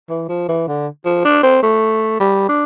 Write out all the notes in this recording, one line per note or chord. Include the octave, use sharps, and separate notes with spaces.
E3
F3
E3
D3
F3
D4
C4
A3
G3
D4